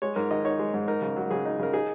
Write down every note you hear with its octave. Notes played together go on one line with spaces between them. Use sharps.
G#3 C#5
G#2 A#4
D#3 D#5
D#4 C#5
G#3
G#2
D#4 A#4
C#3
F#3
C#3 G#4
D#4
C#3 A#4
D#4 G#4